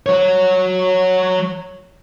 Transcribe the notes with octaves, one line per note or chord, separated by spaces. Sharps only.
F#3 C#5